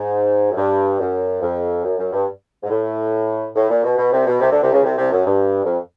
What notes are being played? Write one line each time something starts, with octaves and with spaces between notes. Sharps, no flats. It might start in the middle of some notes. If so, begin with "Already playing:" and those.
Already playing: G#2
F#2
G2
F#2
F2
F#2
F#2
G2
G#2
A2
A2
A#2
B2
B2
C2 C3
B2
C2 C3
D2 D3
C2 C3
C#2 C#3
C2 C3
C2 C3
F#2
G2
F2